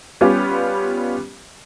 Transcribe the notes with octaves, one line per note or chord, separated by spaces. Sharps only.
G3 B3 C#4 F4 G4